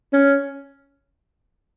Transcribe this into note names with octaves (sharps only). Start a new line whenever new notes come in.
C#4